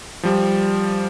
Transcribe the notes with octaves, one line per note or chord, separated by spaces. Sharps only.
F3 G3